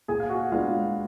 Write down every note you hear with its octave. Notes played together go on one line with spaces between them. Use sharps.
A#2 G#4 G#5
F5
F#4 F#5
G#3 B3 D4 F4 F5